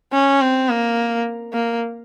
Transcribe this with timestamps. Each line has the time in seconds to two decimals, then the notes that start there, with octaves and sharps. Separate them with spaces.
0.13 C#4
0.41 C4
0.69 A#3
1.53 A#3